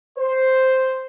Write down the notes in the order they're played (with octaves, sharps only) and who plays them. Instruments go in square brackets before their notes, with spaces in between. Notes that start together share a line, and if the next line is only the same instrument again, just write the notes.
[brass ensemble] C5